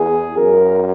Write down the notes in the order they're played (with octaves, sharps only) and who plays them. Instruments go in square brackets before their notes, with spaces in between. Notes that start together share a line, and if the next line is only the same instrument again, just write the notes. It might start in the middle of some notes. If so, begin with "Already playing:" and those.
Already playing: [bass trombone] E2 [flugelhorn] G#4
[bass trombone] F#2 [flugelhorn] A#4